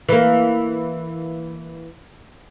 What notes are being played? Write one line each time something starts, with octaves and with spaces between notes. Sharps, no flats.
E3 A#3